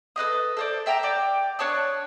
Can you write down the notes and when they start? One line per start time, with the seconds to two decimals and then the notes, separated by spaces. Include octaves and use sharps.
0.16 A4 B4 D#5 D#6
0.57 A4 C5 D5
0.86 E5 G5 A5 A#5
1.03 D5 G5
1.59 D4 C#5 A5 D#6